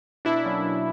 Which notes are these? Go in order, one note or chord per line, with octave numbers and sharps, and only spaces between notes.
B2 D4 E4
F#3 A#3 C#4
B2